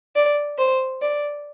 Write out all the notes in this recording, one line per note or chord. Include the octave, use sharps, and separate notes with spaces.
D5
C5
D5